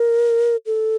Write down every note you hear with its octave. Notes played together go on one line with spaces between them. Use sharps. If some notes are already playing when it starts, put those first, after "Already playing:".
Already playing: A#4
A4